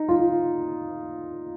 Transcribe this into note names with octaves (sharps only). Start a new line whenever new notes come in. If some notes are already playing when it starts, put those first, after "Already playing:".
Already playing: D#4
F4